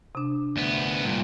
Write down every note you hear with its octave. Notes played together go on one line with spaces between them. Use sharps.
C3 D4
D2 B3
G2 A#2